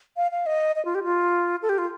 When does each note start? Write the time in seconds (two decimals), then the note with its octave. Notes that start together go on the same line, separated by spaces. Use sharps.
0.17 F5
0.31 F5
0.46 D#5
0.76 D#5
0.85 F4
0.95 G4
1.04 F4
1.62 A4
1.69 G4
1.78 F4